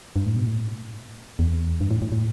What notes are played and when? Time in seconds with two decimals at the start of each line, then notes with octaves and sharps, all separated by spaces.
0.16 G2
0.26 A2
0.36 B2
0.46 A2
1.39 E2
1.81 G2
1.91 A2
2.02 A2
2.12 A2